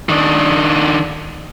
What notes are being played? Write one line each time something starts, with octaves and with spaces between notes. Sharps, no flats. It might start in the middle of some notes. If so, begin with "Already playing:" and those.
D#3 D4